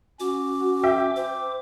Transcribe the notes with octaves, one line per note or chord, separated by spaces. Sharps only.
C#4 F#4 D6
E5 G5
C5 D6